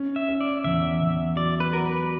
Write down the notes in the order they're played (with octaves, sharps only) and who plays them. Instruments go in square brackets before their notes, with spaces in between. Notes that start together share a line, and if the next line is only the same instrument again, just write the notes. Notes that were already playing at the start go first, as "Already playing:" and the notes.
Already playing: [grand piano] C#4
[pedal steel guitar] E5
[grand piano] C#4
[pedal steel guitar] D5
[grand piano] E2 [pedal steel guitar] E5
[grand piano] E2
[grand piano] F#3 [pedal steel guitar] D5
[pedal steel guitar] B4
[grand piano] F#3 [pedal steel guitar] A#4
[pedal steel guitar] B4